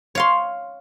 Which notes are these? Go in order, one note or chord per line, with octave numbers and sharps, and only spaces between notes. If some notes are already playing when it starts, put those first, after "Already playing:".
C#5 F5 C6